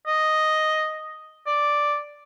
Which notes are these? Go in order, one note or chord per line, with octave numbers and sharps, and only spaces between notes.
D#5
D5